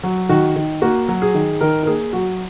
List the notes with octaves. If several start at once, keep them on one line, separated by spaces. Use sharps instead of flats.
F#3
D#3 F#4
D#3
A#3 F#4
F#3
G#4
D#3
D#3 A#4
A#4
A#3 G#4
F#3 F#4